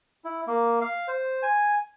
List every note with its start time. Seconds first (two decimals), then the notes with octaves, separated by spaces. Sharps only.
0.25 E4
0.47 A#3
0.81 F5
1.08 C5
1.43 G#5